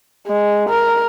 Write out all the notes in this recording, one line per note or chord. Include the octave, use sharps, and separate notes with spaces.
G#3
A#4